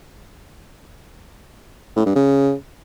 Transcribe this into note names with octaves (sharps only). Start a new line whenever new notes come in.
A2
G2
C#3